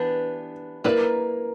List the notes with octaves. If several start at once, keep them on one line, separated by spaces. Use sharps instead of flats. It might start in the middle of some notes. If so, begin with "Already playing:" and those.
Already playing: E3 B3 D4 G4 B4
A#3 E4 A#4 B4 D5